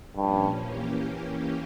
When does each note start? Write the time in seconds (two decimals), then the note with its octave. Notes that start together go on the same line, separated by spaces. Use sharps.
0.17 G2 A#2 F3 C#4
0.61 E3 A#3 C#4 G4